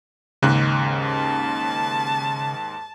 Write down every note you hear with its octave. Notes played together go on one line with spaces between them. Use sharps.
D#2 G#2 C#3 F#6
A5